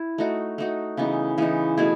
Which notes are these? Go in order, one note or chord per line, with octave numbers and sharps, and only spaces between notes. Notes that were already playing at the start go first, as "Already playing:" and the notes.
Already playing: E4
A3 D#4 F#4
A3 D#4 F#4
C#3 E3 B3 D#4
C#3 E3 B3 D#4
B2 A3 E4 G#4